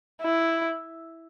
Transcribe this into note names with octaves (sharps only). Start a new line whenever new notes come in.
E4